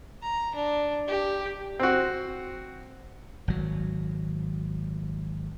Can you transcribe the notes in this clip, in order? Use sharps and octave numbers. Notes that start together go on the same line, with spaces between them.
A#5
D4
G4
C4 F#4
G#1 F#3